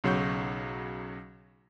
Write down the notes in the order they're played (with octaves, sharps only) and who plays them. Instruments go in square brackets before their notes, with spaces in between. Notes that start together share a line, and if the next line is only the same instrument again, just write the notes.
[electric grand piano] B1 C#3 F#3 F#5 C#6 G6